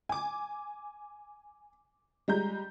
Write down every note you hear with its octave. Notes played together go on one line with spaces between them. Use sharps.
G#5 D6
G3 G#3 A#5 G6